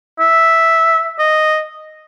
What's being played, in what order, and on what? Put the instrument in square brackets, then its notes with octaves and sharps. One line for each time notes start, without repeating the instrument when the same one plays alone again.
[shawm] E5
D#5